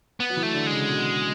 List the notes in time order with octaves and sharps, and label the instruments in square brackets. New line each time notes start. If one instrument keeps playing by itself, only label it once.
[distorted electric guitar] B3
[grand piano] F#3
E3
[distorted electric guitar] A3
[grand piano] D3
[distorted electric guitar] G#3
[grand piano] C#3
B2